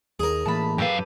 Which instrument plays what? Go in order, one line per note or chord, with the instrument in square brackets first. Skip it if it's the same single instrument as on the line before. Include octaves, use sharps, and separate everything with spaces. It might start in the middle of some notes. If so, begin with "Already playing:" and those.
[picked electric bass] D#2 [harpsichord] G#4 A#4
[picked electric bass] A2 E3 A#3 [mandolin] A5 B5
[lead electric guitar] F#2 F5 [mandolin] G4 A4 B4